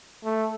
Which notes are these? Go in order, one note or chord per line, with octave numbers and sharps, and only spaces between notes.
A3